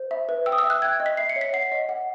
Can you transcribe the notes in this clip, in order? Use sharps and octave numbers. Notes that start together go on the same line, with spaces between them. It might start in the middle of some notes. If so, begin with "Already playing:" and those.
Already playing: C5
E5
B4
G5 E6
D#6
E6
E5
F#6
G5 G#6
D#5
B6
E5 C7
C#7
C#5
B6
F#5 C7
D#5
F#5